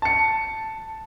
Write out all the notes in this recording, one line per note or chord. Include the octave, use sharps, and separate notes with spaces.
A5 C#7